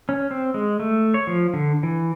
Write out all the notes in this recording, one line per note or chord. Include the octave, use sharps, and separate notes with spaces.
C#4
C4
G#3
A3
C#5
F3
D3
E3